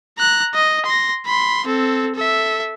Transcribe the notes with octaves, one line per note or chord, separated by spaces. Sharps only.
A#5 F#6
D#5
C6 A#6
B5 C6
C4 A4
A4 E5